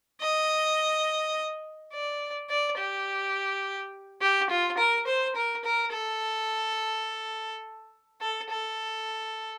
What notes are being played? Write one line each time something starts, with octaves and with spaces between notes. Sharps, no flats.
D#5
D5
D5
G4
G4
F4
A#4
C5
A#4
A#4
A4
A4
A4